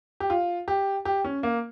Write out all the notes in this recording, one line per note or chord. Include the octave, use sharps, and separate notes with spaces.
G4
F4
G4
G4
C#4
A#3